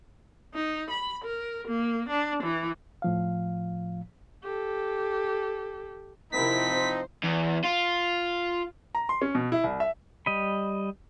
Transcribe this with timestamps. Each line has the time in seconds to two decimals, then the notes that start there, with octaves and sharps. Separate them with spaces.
0.54 D#4
0.91 B5
1.25 A#4
1.68 A#3
2.09 D4
2.43 E3
3.02 A2 F3 F5
4.43 G4 A4
6.32 C3 F3 C4 D#4 E4 A#4 B6
6.73 C5
7.24 E2
7.65 F4
8.95 A#5
9.09 C6
9.22 C#4
9.35 B2
9.52 E4
9.64 C2
9.80 E5
10.26 G3 D#5 B5